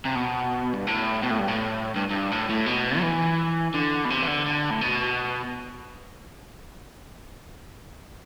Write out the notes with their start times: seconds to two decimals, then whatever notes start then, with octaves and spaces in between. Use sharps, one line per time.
0.05 C3
0.16 B2
0.74 G2
0.87 A2
1.23 B2
1.31 A2
1.39 G2
1.48 A2
1.95 G2
2.10 G2
2.31 A2
2.49 A2
2.66 B2
2.98 F#3
3.03 E3
3.74 D3
4.05 B2
4.10 C3
4.23 E3
4.28 D3
4.46 D3
4.71 A2
4.81 B2